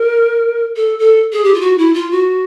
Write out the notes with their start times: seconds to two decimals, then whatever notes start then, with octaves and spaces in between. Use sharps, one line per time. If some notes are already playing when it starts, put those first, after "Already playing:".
Already playing: A#4
0.76 A4
0.99 A4
1.32 G#4
1.44 G4
1.54 F4
1.61 F#4
1.78 E4
1.94 F4
2.11 F#4